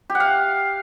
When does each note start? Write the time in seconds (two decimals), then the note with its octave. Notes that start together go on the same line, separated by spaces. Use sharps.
0.10 G4
0.15 F#5
0.20 F5